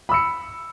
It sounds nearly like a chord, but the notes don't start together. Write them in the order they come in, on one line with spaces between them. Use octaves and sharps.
B5 E6 C#7